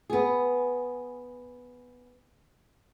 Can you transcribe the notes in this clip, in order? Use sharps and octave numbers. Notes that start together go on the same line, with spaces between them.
B3 G#4